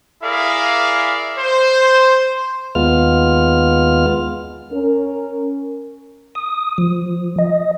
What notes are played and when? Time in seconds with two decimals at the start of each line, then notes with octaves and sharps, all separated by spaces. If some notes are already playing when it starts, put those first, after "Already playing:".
0.23 E4 G#4 A#4 D5 E5 F5
1.37 C5
2.75 D#2 G#3 B3 F4 F6
4.72 C#4 A#4
6.35 D#6
6.78 F3
7.38 D#5